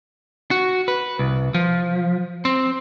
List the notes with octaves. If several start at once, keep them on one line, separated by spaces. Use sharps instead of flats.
F#4
B4
C2
F3
C4